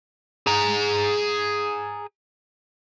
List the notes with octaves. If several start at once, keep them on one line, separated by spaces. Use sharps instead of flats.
G#4 A#5